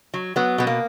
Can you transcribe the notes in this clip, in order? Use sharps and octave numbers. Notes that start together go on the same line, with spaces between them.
F#3
F#3 B3
B2 B3
A#3